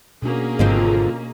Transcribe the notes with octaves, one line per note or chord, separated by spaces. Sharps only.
B2 A#3 C#4 D4 F#4 G#4
G#1 D3 F3 C4 D#5 F5